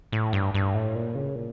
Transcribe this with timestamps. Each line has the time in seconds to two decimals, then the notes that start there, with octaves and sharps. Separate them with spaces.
0.12 A2
0.33 G2
0.54 G2
0.74 A2
0.95 A#2
1.15 C#3
1.36 A#2